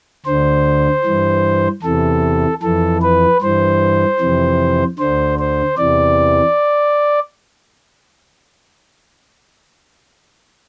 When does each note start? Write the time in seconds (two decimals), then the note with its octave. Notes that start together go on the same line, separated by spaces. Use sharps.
0.26 D2 D3 C5
1.04 G2 E3
1.83 E2 C3 E3 A4
2.62 F2 E3 A4
3.02 B4
3.41 G2 E3 C5
4.20 F2 C3 E3
4.99 D2 D3 C5
5.39 C5
5.77 E2 C3 E3 D5